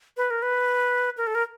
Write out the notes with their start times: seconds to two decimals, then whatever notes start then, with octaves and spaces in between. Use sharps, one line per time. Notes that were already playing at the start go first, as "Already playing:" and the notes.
0.17 B4
0.30 A#4
0.42 B4
1.17 A#4
1.27 A4
1.35 A#4